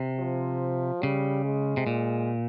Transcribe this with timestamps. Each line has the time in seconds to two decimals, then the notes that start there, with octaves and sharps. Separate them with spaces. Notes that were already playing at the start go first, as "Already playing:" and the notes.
Already playing: C3
0.19 F3
1.03 C#3 G3
1.45 G#3
1.77 C3
1.87 A#2